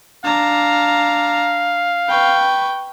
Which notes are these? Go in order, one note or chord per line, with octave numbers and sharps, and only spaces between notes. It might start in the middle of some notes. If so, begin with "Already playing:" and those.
D4 F5 A#5
B4 G5 C#6